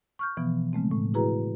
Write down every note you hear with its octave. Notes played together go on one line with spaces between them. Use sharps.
C#6 F6 G6
B2 E3 F3 B3
C#3 G#3 A3 C4
A2
E4 F#4 G#4 B4 A#5